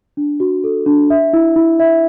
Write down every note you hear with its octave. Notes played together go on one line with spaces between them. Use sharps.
D4
F#4
A4
D4
E5
E4
E4
E5